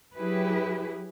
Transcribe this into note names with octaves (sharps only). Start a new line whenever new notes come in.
F#3 E4 G4 G#4 B4